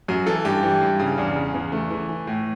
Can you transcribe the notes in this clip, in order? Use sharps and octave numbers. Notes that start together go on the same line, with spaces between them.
F#2 F#4
E3 A4
G2 G4
E3
G2
C#3
E2 D4
C#3
E2 B3
E3 A3
E3
E3
A2